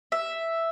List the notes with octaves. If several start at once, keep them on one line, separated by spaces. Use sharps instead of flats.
E5